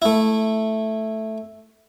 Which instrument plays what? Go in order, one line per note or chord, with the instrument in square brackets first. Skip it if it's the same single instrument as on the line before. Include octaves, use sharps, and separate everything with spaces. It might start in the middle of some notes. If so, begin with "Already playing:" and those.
[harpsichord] A3 E4